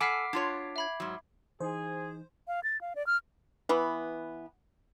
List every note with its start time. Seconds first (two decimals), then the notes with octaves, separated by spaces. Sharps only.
0.01 A4 F#5 G#5 B5 D6 F6 B6 C7
0.33 D4 F4 C#5 G#6
0.76 E5 B5 G#6
1.00 G#2 F#3
1.60 E3 D#4 G#4 C5
2.48 F5
2.64 A6
2.81 F5
2.96 D5
3.07 F6
3.69 E3 B3